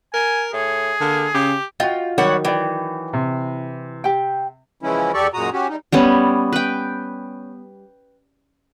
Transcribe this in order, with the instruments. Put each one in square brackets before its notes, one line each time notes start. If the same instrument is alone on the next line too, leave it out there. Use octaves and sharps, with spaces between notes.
[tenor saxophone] A#4 [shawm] G#5
[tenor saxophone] A2 [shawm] G#4
[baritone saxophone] D3 [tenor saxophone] A#3
[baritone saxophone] C#3 [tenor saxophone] G4
[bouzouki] F4 [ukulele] F#4 D#5 [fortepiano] G5
[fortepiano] D#3 F#3 [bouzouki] G3 C#5 F#5
[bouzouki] E3 [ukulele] D5 G5
[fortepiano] C3
[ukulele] G4 G5
[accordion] C#3 E3 F3 G#3 C#4 E4
E2 G4 A4 D5 C#6
F#2 A#2 G#3 F#4 A#5 D#6
C#4 F#4 G4
G3 D#4
[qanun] G3 B3 C#4
B4 G5